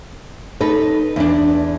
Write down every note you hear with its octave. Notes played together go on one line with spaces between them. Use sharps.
D#4 A4 B4
E2 D4